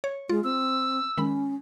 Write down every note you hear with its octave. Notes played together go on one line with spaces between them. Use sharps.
C#5
G#3 F4
C4 E6
D#3 G#3 C#4 B5